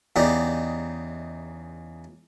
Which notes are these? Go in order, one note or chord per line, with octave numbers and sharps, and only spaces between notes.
E2 C#3 D#4 G4 D5 D#5